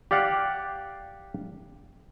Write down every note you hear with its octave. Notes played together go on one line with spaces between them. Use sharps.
G4 D5 F5 F#5